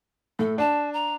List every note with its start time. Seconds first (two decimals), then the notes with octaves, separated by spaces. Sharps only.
0.39 A2 A4
0.58 D4 A5
0.93 A#5